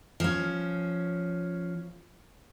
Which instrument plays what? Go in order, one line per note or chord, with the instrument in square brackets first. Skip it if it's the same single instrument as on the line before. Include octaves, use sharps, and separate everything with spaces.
[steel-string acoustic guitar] F3 C#4